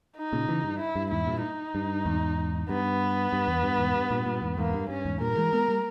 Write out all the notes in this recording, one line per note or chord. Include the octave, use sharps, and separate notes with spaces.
D#4
A#2 C#3
C#3 E3
G2
E4
G2
E2 G#2 E4
G2 A#2
D#4
G2
E2 G#2
G2 B3
G2
E2
G2
E2 G#2
G2
G2 A#2
G2 A#2
E2 G#2
E2 G#2 A#3
G2
G2 C#4
E2 G#2
G2 A#2 A#4
E3 G#3
G#3 B3
G3 A#3